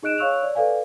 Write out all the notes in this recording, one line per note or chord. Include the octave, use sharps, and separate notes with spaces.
D#4 G#4 D#5 F#6 D7 E7
C#5 F5 C#6 E6 F#6 F7
D5
A4 B4 D5 F5 G#5